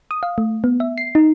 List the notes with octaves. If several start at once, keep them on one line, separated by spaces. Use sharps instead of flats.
D#6
F5
A3
B3
E5
C7
D#4